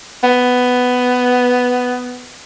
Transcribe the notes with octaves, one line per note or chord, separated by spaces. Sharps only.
B3